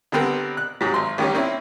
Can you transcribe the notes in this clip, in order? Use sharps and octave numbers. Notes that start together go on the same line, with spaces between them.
D3 G3 B3 C4 A#4
F#6
G#2 C3 F#3
G#1 C6
A1 D#3 G3 C#4
A#3 C4 C#4 E4